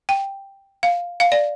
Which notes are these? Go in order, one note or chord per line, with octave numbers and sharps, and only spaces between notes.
G5
F5
F5
D5